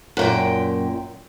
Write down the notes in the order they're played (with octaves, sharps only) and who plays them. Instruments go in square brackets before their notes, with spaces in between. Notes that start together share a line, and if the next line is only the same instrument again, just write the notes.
[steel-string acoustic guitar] F#2 A#2 G5